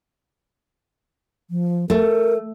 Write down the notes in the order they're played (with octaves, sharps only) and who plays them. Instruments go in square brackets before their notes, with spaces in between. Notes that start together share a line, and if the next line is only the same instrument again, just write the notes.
[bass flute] F3
[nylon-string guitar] A3 [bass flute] A#4